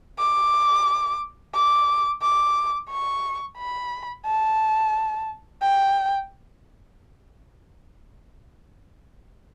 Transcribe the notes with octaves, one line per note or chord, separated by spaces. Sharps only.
D6
D6
D6
C#6
B5
A5
G5